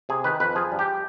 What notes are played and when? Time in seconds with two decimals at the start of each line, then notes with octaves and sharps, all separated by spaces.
0.09 C3 G#4
0.24 D#3 B4
0.40 F2 B4
0.55 F3 G#4
0.72 G2
0.79 G4